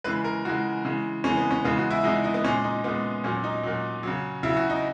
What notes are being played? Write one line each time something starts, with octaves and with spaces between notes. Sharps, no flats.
C#3 E3 G#3 B4
A#4
C#3 E3 G#3 F#4
C#3 E3 G#3
C#3 E3 G#3 C#4
B3
C#4
C#3 E3 G#3 B3
F#4
E4
C#3 E3 G#3 D#4
D#4
B3
A#2 G#3 C#4
D#4
A#2 G#3 B3
A#2 F#3 C#4
D#4
A#2 F#3
C#3 F#3
C#3 F#3 E4
F#4
D#4